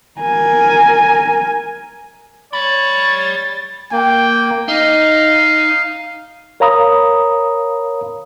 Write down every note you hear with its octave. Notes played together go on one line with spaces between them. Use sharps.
A#4 G#5
C#5 D5 B5 A6
A#3 G5
D#4 F5
A#4 C#5 F5 A#5 B5 D#6